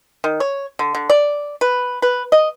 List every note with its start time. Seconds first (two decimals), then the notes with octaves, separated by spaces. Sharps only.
0.24 D#3
0.40 C#5
0.79 D3
0.95 D3
1.10 D5
1.61 B4
2.02 B4
2.32 D#5